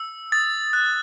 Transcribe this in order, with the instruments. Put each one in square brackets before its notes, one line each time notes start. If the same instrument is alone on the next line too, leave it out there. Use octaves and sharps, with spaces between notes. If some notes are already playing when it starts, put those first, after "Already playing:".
Already playing: [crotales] E6
D#6 A6
F#6